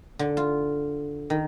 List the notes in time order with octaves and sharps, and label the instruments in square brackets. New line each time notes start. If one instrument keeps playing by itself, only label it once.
[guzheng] D3
F4
D#3